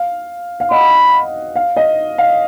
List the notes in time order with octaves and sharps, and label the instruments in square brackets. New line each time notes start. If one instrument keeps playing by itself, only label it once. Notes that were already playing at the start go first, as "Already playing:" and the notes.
Already playing: [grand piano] F5
F5
[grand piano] D#5 F#5 [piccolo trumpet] B5
[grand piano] F5
D#5
F5